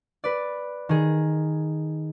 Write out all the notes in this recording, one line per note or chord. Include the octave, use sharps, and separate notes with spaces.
B4 D5
D#3 G#4